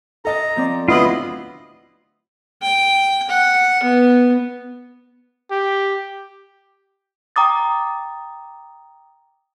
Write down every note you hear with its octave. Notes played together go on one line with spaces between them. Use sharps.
A4 D#5 A#5 A6
F3 C4 D5
D2 D3 F#3 B3 E4 F4 D#5 B5
G5
F#5
B3
G4
G5 A#5 D6 D#6 A6